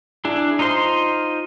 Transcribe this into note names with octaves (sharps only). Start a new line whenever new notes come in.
D4 E4 G#4
D#4 F4 C5 C6